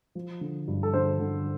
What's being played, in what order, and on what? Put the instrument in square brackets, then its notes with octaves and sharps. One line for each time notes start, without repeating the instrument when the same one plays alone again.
[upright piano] F3
D3
G2
A4
D3 C5
D3